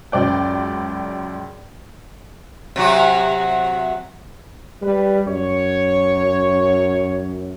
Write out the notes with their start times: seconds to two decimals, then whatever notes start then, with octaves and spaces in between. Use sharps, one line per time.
0.12 C#2 F#2 D5 G5
2.76 C3 F#3 F#4
4.82 G3 B4
5.27 F#2 C#5